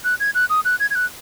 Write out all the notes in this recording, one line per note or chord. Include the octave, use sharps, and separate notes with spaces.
F#6
G#6
F#6
D#6
F#6
G#6
G#6
F#6